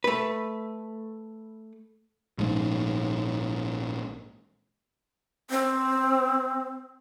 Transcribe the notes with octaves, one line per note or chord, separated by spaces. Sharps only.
A3 B4
A#1 G#2
C4